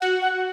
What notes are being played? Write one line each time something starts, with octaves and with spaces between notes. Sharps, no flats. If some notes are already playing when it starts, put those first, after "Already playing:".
F#4 F#5
F#5